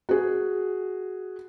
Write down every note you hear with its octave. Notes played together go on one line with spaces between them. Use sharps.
F#4 G#4